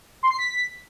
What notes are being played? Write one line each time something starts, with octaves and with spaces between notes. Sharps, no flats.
C6
C7
B6